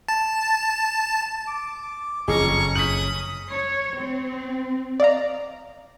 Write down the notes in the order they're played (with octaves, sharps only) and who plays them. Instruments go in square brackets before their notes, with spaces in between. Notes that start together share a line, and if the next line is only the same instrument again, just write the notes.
[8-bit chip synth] A5
[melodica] D6
[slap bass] F#1 [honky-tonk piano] F2 G#4 [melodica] C#4 [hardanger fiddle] A#5 C#6
[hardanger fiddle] D#6 [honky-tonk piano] B6 F#7
[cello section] C#5
C4
[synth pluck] D5 D#5 F5 A#5